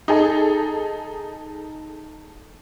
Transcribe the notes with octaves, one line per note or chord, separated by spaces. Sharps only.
D#4 G#4 A4